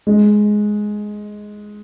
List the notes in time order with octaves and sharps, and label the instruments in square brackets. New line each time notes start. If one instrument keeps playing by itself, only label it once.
[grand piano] G#3